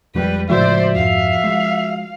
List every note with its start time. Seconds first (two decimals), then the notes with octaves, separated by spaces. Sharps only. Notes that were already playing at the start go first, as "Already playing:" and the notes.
0.15 F2 F3 G3 G#3 B4
0.50 A2 C#3 F3 G#3 F#4 C5 D5 E5
0.95 F2 G#2 F5
1.44 G#3